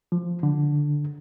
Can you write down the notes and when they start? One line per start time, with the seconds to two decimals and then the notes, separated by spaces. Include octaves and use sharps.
0.12 F3
0.43 D3